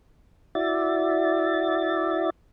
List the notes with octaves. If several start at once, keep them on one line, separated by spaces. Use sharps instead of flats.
E4 F#4 D5 E5 A6